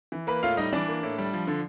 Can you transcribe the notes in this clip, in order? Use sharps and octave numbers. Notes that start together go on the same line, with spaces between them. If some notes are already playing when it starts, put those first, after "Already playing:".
E3
A#3 B4 B5
A2 F4 F5
G3 D#4 D#5
E3 D4 D5
A#3
A2
G3
F3
D3